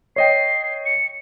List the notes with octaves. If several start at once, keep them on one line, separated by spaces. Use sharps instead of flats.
C#5 D#5 G5 C7
C#7